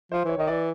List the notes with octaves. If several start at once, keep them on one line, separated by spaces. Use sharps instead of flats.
F3 C5
E3 C#5
D#3 D#5
E3 D5